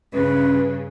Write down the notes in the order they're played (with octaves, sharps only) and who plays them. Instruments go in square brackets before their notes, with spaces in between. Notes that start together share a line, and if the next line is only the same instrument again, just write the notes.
[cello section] G2 C#3 [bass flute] C#4 [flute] B4